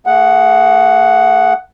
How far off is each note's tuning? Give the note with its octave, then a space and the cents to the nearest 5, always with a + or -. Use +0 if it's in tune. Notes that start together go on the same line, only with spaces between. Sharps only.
A3 +45 G#4 +5 F#5 +0